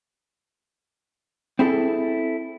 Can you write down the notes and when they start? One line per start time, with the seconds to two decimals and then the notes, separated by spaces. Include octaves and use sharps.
1.59 C4 E4 G#4 A4